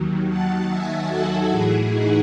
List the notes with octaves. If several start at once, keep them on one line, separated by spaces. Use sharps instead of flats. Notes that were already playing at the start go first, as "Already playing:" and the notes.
Already playing: D#2 D#3 F#3
F#5 A5
E5 G#5
F#4 A4
A2 E3 E4 G#4
D#4 F#4